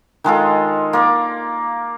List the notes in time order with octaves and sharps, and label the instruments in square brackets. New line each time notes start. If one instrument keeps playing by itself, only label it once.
[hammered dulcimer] D#3 G#3 F4 A4
A#3 D5